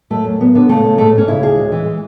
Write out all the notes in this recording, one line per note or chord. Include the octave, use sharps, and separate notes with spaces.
F#2 A3
F#2
F#2 B3
D3 B3
C#3 A3
C#3
G#2 A3
G#2 C#4
C#3 E4
D2 G#4
G#3
E3
G#3